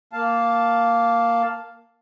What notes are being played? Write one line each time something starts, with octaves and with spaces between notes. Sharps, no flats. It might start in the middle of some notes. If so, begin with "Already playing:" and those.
A#3 F5 A5